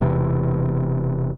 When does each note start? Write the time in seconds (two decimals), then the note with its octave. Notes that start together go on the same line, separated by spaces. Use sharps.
0.01 E1 E2 C3 E3